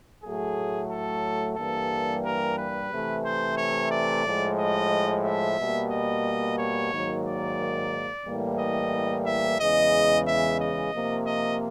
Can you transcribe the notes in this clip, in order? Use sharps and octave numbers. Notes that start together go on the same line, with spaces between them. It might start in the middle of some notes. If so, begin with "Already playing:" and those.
A2 F#3 A3 G#4
A4
G2 E3 G3 A#3 A4
A#4
B4
C3 E3 A3
C5
C#5
D5
A2 F3 G#3
D#5
E5
B2 G3 A#3
D#5
C#5
G#2 D#3 F#3 A#3
D5
A2 E3 G3 A#3
D#5
E5
E2 C#3 E3 G#3 D#5
E5
D#5
C3 F3 A#3
D#5